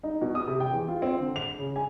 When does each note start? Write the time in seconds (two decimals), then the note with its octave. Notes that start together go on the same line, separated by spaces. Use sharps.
0.03 D#4
0.21 B2
0.35 D#6
0.47 C3
0.60 G5
0.73 E2
0.88 F4
1.02 C4
1.20 D3
1.36 F7
1.59 C#3
1.76 G#5